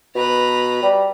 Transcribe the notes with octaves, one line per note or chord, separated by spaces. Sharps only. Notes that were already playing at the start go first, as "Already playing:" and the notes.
B2 B4 A#5
G3